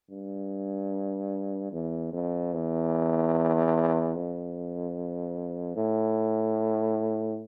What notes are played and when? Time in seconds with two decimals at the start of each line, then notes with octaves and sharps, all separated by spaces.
0.10 G2
1.72 E2
2.13 F2
2.53 E2
4.15 F2
5.76 A2